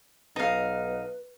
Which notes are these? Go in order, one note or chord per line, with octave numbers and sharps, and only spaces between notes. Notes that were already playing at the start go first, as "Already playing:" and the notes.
B1 D#4 B4 F5